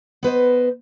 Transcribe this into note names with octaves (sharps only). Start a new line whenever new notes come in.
B3 B4 C5 D#5